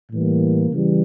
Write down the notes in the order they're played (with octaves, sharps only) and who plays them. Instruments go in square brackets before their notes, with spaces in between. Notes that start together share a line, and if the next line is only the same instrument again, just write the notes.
[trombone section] A2 E3 G3 A#3
C#3 E3 G3